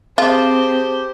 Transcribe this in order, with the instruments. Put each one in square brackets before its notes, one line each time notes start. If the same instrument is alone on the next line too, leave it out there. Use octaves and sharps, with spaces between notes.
[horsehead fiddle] C4 [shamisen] F4 [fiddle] G4 C5 [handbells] G#4 A5 D6